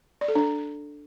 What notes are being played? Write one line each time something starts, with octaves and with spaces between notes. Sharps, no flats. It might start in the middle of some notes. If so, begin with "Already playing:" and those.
D5
A4
D4